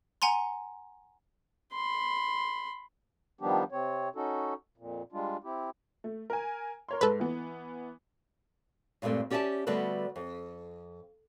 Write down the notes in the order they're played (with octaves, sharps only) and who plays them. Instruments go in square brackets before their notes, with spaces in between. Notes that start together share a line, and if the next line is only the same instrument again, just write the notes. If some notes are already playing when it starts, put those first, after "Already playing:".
[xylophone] F#5 G#5 A#5 C6
[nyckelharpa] B5 C6
[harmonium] D#3 F3 G3 B3 D4 G4
C3 C4 C#5
C#4 D#4 F#4 A4
F2 A#2
G3 G#3 D4 F4
C4 E4 G4
[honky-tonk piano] A3
A#4 G#5
A#4 C#5 C6
[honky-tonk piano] G#2 [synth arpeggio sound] A4 B4
[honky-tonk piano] E3 B3
[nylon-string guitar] G2 A#2 G#3 A3 C4
C#4 G4 D5 E5 G#5 A5
D3 G3 A3 B3 F#4 B4
F2